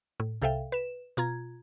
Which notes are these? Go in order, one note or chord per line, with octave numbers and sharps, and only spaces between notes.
A2
C2 C3 A4 E5 F5 G5
B4 E7
B2 F4 A#5 G#6